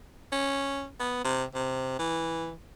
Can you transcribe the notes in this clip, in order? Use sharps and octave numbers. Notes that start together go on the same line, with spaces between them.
C#4
B3
C3
C3
E3